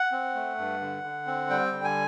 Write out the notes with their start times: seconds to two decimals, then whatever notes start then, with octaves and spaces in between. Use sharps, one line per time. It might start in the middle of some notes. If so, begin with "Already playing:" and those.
Already playing: F#5
0.12 C4
0.35 A3
0.58 G2
0.81 D3
1.04 D3
1.27 C4
1.50 G3 G5
1.73 D3
1.84 G#5